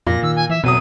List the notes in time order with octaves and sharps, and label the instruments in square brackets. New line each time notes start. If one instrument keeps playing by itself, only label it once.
[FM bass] F2 [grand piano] A#2 [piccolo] A#6
[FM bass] D#3 [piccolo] E6
[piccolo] G#5
[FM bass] E3 [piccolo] E5
[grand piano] F1 F#3 D#6 [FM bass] B2 [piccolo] D#7